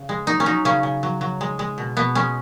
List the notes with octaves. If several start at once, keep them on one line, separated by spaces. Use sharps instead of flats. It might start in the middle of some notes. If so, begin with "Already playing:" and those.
Already playing: C#3
G#3
F#3 D#4
C#4
F#3 D#4
C#3 C#4
C#3
F#3
F#3
G#3
G#3
B2
B2 B3
G#3 C#4